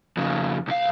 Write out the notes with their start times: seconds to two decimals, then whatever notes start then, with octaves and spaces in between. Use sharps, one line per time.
0.17 F2 C#3
0.68 C2 F5